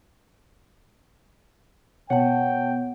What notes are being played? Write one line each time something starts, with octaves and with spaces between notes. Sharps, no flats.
B2 C#5 F#5 G5 A5